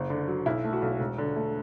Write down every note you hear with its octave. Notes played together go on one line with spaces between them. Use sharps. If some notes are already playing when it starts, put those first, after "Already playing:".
Already playing: F#1
D3
F#3
B1 E4
A3
F#4
B1
E1
D3
A3